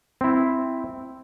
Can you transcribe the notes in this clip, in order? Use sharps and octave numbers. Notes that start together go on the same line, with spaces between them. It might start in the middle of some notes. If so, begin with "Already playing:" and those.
C4 E4